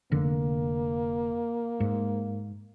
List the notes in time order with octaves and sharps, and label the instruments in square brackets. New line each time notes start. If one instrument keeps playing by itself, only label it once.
[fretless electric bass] F1 D3 [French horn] A#3
[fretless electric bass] G#2